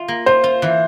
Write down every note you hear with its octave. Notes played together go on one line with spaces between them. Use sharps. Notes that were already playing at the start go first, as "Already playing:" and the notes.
Already playing: F4
A#3
F4 C5
F4
E3